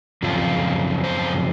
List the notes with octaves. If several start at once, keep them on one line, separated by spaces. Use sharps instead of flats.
F#2 C#3 F3 C4 F4
C5